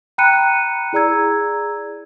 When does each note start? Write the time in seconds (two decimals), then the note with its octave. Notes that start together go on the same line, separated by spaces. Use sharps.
0.18 G5 A#5 B5 F#6 C#7 D#7
0.93 E4 G#4 D5 A#5 E6 G#6